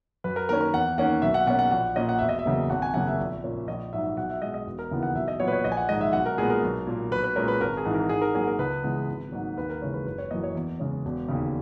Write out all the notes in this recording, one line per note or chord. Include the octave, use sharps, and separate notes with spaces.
F#2 B4
A#4
D#3 A#3 C#4 A#4
A#4
E2 F#5
D#3 A#3 C#4 F#5
B1 E5
F#5
B2 A#3 C#4 F#5
F#5
A#1 F#5
A#2 A#3 C#4 D#5
F#5
E1 E5
D#5
E5
E2 C#3 F#3 A#3
G#1 F#5
G#5
F#2 C#3 F#3 A#3 F#5
E5
A#1
A#2 A#3 C#4
A#1 D#5
G#2 F#3 E5
B1 F#5
E5
B2 G#3 D#5
D#5
E1
A#4
D#2 C#3 E3 B3
F#5
B1 E5
D#5
A#2 F#3 B3 C#5
B4
C#5
A#1 D#5
G#5
F#5
G#2 D#3 G#3 D#5
E5
B1 F#5
A#4
A#2 G#3 B3 G#4
A#4
B1
A#2 A#3
B1 B4
B4
A#2 G#3 C#4 A#4
B4
G#1 A#4
G#4
G#2 E3
A#4
G#2 G#4
A#4
F#3 A#3 G#4
A#4
C#2 B4
C#3 E3 G#3 B3
G#1
G#2 F#3 A#3
D#2 B4
A#4
C#3 E3 G#3 C#5
B4
F#1 B4
C#5
F#2 E3 A#3 D#5
C#5
E2
C#3 G#3 C#4
E1
D#2 C#3